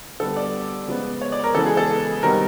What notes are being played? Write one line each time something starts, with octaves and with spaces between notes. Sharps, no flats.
D3 G3 B3 A4
D5
C#3 F3 G#3 B3
C#5
D5
A#4
C#3 E3 G#3 B3 A4
G#4
A4
C3 D#3 G3 B3 A#4